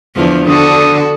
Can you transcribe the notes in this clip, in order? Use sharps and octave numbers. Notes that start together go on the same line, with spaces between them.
E2 D3 F3
D3 F#4 A4 D#6